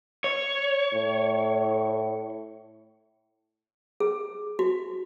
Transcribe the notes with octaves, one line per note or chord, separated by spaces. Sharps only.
C#5
A2
G#4
F#4